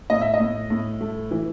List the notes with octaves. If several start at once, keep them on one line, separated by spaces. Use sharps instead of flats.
A2 D#5
E5
D#5
A2
A2
A3
E3